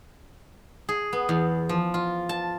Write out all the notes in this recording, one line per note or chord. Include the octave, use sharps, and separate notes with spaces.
G#4
B3
E2
F3
F4
A5